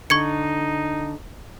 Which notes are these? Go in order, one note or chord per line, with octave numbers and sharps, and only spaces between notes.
D3 D#4 C#6 G#6 C#7